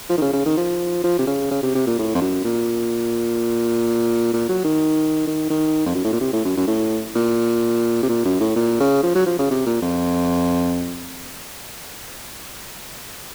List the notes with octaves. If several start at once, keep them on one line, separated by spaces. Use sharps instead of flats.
F3
D#3
C#3
C#3
D#3
F3
F3
C3
C#3
C#3
C3
C3
A#2
A2
F2
F#2
A#2
A#2
F#3
D#3
D#3
D#3
F2
F#2
A2
A#2
C3
A2
F#2
F#2
A2
A#2
C3
A#2
F#2
A2
A#2
C#3
F3
F#3
F3
C#3
C3
A#2
F2